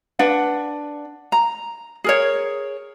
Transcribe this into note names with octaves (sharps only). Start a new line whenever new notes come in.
D4 B4 F#5
A#5
G#4 A#4 C#5